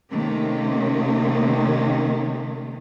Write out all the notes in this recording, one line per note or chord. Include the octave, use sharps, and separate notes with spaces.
C3 D#3 A3 A#3 C#4